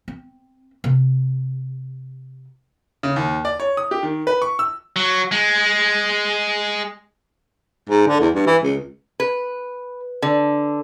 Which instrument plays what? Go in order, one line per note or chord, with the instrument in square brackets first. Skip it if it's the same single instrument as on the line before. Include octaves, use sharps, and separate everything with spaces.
[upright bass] C4
C3
[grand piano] C#3
D#2
D5
C#5
D#6
G4
D#3
B4
C#6
E6
[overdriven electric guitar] F#3
G#3
[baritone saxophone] G#2
D3
E2
G2
E3
C#2
[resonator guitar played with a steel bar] B4
D3